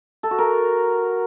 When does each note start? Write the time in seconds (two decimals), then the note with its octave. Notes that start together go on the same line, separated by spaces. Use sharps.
0.23 A4
0.31 F#4
0.38 A#4